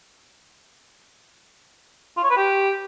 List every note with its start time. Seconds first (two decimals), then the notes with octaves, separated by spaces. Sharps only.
2.17 F4
2.24 C#5
2.30 B4
2.37 G4